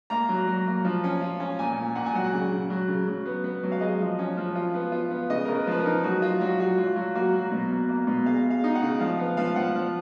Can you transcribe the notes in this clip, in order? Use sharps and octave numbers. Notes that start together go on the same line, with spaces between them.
A#3 A#5
F#3
F#3
A#3
F3
C#4
F4
C#4
A#2 G#5
A#2
A#2 F#5
G#5
F#3 F#5
C#3
C#3
F#3
C#3
F#3
B3
B3
F#3
F5
G#3 D#5
F3
C#4
F3
F4
B3
F4
B3
C#3 D#5
C#3 A#4
B4
F3 B4
A#4
D#4
F#3 F#4
F4
F#3 F#4
F4 F#4
F#3 F4
F#3
A#3 F#4
F#3
B2
A#3
A#3
B2
G#3 F5
G#3
F5
D#4
F#5
C#3
F3 F5
B3 F5
F3 F5
F3 F#5
F3